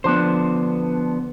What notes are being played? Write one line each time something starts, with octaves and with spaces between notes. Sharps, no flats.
D3 F3 B3 D4 C5